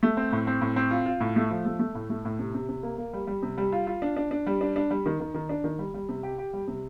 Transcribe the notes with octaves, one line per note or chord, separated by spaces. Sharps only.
A3
C4
A2
C4
A2
C4
F4
F4
A2
A3
F3
A3
A3
A2
A3
A2
C3
C3
C3
A#3
A#3
G3
G3
C3
G3
F4
F4
D4
D4
D4
G3
D4
D4
G3
D#3
D#3
D#3
D4
D#3
G3
G3
C3
G4
G4
G3
C3